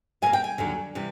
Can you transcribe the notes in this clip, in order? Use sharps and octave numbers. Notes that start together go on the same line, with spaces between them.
C3 F3 A#3 G#5
G5
G#5
D#2 D3 F#3
C3 E3 G3